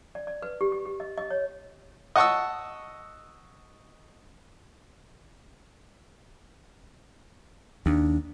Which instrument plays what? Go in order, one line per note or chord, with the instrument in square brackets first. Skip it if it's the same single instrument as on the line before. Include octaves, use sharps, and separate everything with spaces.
[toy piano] D5
D5
B4
G4
G4
G4
D#5
D#5
C#5
[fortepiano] D#5 F#5 A5 C#6 D#6 E6
[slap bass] D#2 [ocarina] D4